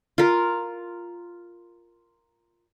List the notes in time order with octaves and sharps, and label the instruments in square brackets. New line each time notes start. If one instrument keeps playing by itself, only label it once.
[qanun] F4 A#4